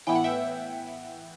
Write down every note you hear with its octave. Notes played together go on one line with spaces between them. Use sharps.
A2 E3 B3 E4 G5
F#5
E5 G5